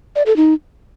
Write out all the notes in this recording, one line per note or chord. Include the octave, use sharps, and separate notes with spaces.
D5
A4
D#4